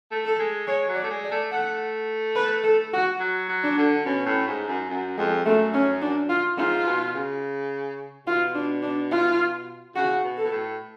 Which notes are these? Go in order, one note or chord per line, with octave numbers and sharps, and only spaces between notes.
A3
A4
G#3
G#3 C#5
F#3
D5
A3
G#3
D5
A3
A3 F#5
B4
A4
F#4
F#3
F#3
D4
D3
B2 C#4
A2
G#2
F#2
F#2
F2 G#3
F#2 A3
C#4
D4
F4
G#2 F4
B2
C#3
B2 F4
D4
D4
F4
C#3 F#4
B2
A4
B2
A2